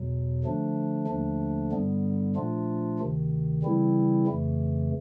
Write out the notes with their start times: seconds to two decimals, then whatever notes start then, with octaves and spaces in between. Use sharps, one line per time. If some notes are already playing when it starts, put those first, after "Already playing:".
Already playing: E2 B2 F#3
0.44 D3 F3 A3 D4
1.07 D#2 D3 F3 A3 D4
1.72 G2 D3 G3 B3
2.36 A#2 F3 A3 D4 F4
2.99 D2 C3 D#3
3.63 C#3 E3 G3 C4 E4
4.27 F2 C#3 E3 A3